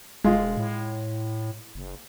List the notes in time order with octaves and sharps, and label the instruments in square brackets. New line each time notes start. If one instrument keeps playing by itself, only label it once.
[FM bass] E1 [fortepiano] G#3 F4
[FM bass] A2
F#1